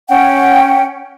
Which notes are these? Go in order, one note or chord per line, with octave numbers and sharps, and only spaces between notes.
C#4 F#5 G5